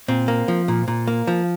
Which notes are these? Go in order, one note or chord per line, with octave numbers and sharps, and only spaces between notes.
A#2 C4
A#3
F3
A#2
A#2
A#3
F3